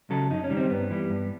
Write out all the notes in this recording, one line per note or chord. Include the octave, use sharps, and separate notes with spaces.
C#3 F#3 A4
F#2 D#4
C#4
D#3 G3
C4
G2 B3
E3 G3
G2